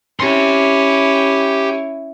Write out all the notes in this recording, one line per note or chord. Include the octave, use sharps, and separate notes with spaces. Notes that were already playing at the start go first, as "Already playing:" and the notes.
C#4 E4 G4 C6